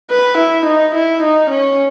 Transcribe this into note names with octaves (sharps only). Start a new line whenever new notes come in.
B4
E4
D#4
E4
D#4
C#4